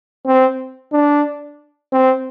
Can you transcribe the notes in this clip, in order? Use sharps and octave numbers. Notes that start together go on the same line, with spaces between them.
C4
D4
C4